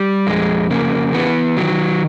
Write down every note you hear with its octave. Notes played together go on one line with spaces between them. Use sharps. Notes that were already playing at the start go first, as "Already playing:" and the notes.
Already playing: G3
F2 G#3
C#3 A#3
E3 B3
D#3 F#3